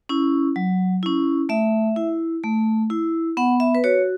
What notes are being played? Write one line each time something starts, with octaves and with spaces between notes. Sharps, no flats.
C#4 E4
F#3
C#4 E4
A3 E5
E4
A3
E4
B3 F#5
E5
B4
F#4 C#5